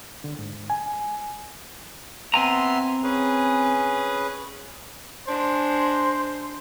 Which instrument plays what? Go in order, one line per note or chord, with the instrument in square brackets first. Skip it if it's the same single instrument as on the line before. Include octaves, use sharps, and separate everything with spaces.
[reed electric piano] D3
G#2
G#5
[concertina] B3 E5 C6 [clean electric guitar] C4 G#5 A#5
[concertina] C#4 G#4 B4
[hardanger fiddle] G#3 D4 [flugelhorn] C5